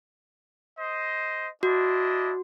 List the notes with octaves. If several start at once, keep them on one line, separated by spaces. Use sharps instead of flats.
C5 D#5
D4 E4 F#4 D#5